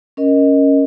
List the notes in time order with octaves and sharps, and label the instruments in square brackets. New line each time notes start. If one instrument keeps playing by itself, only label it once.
[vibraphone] C#4 A#4 D#5